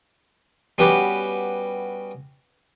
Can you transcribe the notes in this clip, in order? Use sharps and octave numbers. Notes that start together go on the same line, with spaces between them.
G3 B3 C#4 F#4 G4 B4